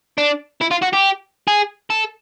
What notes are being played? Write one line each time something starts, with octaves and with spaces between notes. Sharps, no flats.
D4
E4
F4
F#4
G4
G#4
A4